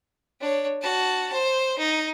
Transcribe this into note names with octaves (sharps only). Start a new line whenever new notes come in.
D4 C#5
F#4 A5
C5
D#4